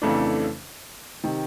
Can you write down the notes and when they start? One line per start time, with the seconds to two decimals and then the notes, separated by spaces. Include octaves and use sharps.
0.02 F2 C#3 E3 A3 D4
1.24 C3 D#3